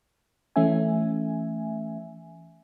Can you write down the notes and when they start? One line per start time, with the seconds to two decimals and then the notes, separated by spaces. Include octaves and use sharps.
0.56 E3 A3 C#4 E5 G#5